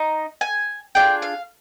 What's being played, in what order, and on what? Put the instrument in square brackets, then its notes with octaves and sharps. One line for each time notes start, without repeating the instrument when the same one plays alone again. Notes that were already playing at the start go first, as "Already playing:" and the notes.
Already playing: [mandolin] D#4
G#5
D4 F4 G#4 G5
F5